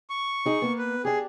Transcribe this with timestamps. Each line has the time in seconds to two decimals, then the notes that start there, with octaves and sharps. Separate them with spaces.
0.10 C#6
0.46 D#4 G#4
0.62 A#3 B3
0.78 B4
1.05 D4 G4 G#4